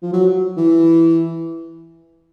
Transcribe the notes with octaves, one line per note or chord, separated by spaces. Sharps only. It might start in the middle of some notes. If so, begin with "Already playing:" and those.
F3
F#3
E3